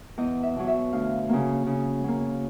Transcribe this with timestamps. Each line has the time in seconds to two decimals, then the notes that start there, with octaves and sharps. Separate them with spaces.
0.18 E2 D#5
0.43 E5
0.56 B2 F#3
0.68 E5
0.93 D2 F5
1.29 C#3 F#3 A#3
1.66 C#3
2.04 F#3 A#3